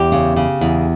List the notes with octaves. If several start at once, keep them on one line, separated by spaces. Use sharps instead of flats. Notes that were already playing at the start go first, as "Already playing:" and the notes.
Already playing: E2 G4
C#3
C#3
E2